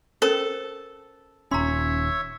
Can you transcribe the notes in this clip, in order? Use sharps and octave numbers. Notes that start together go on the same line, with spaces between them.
C#4 A4 A#4 C5
D#1 C#4 C#5 E5 A#5 C6